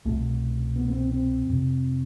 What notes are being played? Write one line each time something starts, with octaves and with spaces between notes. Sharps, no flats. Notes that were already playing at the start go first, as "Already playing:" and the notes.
C2 B2 A3
B3
B3
C4
C4
F2 C3